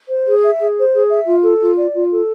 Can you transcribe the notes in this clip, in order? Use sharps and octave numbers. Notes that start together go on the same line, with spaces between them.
C5
G#4
E5
G#4
C5
G#4
E5
F4
A4
F4
D5
F4
A4